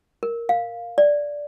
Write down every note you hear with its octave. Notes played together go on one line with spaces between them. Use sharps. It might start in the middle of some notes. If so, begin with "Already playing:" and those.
A#4
F5
D5